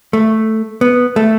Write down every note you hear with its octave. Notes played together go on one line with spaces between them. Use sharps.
A3
B3
A3